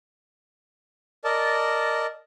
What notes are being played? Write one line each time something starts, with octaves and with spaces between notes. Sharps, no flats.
A#4 D5 D#5 A5